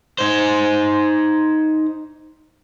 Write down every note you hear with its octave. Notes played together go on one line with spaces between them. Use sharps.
D#4 C5